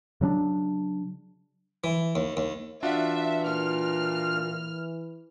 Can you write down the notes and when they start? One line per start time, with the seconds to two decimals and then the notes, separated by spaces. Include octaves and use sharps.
0.21 C#3 F#3 C#4 D4
1.84 E3
2.15 D#2
2.37 D#2
2.83 E3 D4 F4 F#4 E5
3.46 A#2 F6